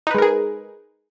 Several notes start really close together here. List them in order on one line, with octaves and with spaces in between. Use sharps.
D#4 B4 G#3 A#4 G#4